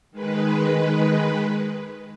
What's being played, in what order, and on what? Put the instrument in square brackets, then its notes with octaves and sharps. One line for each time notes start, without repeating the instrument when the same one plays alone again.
[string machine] D#3 G#3 B4